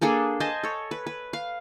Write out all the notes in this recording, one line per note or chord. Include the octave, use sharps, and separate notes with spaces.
A#3 D4 G#4 A4
C5 D#5 G#5 A5
A4 C#5
B4
B4
F5